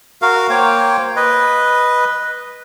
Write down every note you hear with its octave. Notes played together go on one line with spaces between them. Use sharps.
F#4 A#4 F5
A#3 C5 C#5 G5
B4 D#5